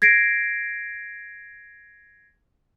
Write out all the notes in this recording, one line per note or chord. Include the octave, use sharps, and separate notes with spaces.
G#6 A#6 C7 D7